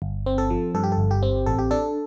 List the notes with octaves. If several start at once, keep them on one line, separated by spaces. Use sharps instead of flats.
G1
C4
A4
F3
G2 A4
G4
A4
G1
G4
C4
A1 A4
G4
D4 A4